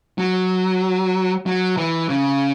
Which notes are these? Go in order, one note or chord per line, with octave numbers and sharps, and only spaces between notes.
F#3
F#3
E3
C#3